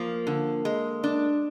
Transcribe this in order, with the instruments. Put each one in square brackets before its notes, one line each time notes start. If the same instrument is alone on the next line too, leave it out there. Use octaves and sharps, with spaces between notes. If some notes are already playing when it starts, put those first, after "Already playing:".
Already playing: [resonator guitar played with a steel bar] F3 [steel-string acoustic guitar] A#3
[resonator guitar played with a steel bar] D3
G#3
D4